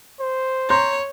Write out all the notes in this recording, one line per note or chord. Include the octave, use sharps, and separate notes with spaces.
C5
C#5 A#5 C6 G6